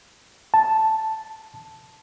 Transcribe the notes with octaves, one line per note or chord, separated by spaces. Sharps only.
A5